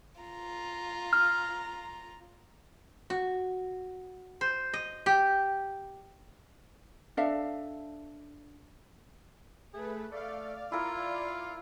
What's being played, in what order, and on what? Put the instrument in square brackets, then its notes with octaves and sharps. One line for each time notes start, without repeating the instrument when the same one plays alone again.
[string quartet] F4 A#5
[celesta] F6
[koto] F#4
C5
D#5
G4
[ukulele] D4 A4 E5 F5
[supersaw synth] A3 B4 [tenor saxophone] G#4
[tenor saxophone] A3 [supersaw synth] D5 F5
[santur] E4 A#4 [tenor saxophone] F4